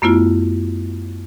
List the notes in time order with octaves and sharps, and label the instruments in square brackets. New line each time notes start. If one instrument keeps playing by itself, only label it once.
[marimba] F#2 A3 B3 E4 F4